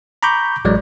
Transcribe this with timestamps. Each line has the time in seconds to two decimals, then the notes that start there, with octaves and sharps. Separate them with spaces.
0.23 A#5 B5 C#6 D6 G6
0.65 A1 F#3 G#3 D5